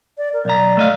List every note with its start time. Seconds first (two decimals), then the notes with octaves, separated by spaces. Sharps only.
0.18 D5
0.33 A#4
0.45 B1 D5 A#5
0.77 A3 D#5 F5